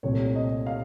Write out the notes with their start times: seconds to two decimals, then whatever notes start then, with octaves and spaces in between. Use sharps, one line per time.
0.03 C2 A#2 A3 C4 C#5
0.36 D#5
0.67 F5